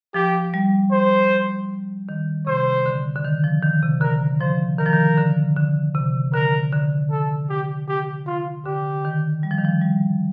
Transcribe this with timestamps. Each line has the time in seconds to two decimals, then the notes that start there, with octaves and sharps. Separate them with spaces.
0.14 F3 G4
0.54 G3
0.92 C5
2.09 D#3
2.47 C3 C5
2.86 D3
3.16 D3
3.25 D#3
3.44 F3
3.63 D#3
3.82 C3
4.01 D3 A#4
4.40 F3 C5
4.79 D#3 A#4
4.86 F3
4.93 D#3
5.18 D3
5.56 D3
5.95 C3
6.33 D3 A#4
6.72 D3
7.11 A4
7.49 G4
7.88 G4
8.27 F4
8.65 D3 G4
9.05 D#3
9.43 G3
9.51 F3
9.58 D#3
9.64 F3
9.82 G3